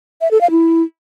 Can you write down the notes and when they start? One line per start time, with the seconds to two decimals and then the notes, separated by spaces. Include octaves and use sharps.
0.21 E5
0.31 A4
0.41 F5
0.51 E4